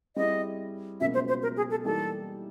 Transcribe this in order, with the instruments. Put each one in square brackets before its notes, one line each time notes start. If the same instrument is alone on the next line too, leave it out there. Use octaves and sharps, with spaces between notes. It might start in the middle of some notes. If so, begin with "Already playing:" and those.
[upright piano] G3 C4 E4 G#4 [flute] D#5
[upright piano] C#2 B2 F#3 A#3 C#4 [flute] E5
[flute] C5
C5
A#4
G#4
A4
[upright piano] E3 G3 A#3 D#4 G4 [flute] A4